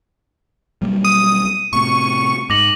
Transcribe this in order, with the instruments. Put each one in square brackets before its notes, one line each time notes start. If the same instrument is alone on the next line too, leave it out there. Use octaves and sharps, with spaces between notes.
[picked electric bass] B1 G3 A#3
[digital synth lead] D#6 [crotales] D#7
[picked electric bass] A2 C3 [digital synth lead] C#6
[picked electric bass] G#2 [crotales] D6 A#6 F#7